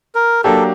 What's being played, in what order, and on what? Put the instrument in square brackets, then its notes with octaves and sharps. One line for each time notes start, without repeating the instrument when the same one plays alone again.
[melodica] A#4
[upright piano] F#3 A#3 D4 G4 [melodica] A4